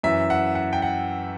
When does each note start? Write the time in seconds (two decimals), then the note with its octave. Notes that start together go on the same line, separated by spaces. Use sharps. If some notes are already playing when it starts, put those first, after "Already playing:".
0.03 F#2 E3 E5
0.30 F#5
0.55 F#5
0.73 G5
0.82 F#5